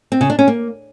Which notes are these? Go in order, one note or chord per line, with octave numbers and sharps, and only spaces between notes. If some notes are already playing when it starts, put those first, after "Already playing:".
C4
C#3
D4
C#4
A#3